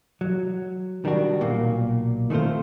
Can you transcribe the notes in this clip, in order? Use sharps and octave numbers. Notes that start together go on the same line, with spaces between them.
F#3
D#3 G3 D4 F#4
B1 A#2 A#3
D#3 A3 C4 F4 C5